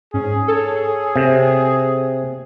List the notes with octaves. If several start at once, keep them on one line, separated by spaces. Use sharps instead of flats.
G#2 C#4 G#4
A4 C#5
C3